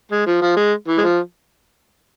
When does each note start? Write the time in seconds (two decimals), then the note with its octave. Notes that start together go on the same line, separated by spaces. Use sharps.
0.12 G#3
0.26 F3
0.42 F3
0.57 G#3
0.88 E3
0.98 G#3
1.03 F3